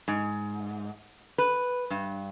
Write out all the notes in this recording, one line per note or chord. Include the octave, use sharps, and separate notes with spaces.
G#2
B4
G2